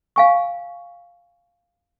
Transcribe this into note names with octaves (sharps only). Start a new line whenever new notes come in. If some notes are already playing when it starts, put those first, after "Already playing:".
F5 G#5 C#6